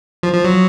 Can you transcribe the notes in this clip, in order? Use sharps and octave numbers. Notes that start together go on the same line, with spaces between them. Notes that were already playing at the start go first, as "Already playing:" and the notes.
F3
F3
F#3